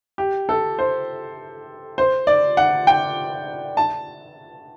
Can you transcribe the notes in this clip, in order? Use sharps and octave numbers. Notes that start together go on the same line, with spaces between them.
G4
A4
C5
C5
D5
F#5
G5
A5